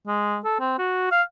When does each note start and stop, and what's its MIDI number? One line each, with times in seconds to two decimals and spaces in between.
0.07 0.38 56
0.45 0.56 69
0.60 0.75 60
0.78 1.07 66
1.11 1.22 77